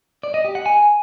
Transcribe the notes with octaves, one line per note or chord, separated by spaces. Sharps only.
D5
D#5
G4
F#5
G#5